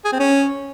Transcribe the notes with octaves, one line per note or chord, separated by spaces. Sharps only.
G#4
C4
C#4